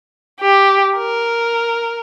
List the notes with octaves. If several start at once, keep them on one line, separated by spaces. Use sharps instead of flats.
G4
A#4